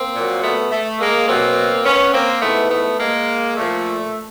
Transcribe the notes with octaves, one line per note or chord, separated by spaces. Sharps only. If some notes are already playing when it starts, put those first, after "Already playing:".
Already playing: A#3 C4
A#2 F#3
A3 B3
A3
G#3 A#3
B2 F#3 A#3 C4
B3 C#4
A#3 C4
G#2 E3 A3 B3
A3 B3
G#3 A#3
A#2 F3 A3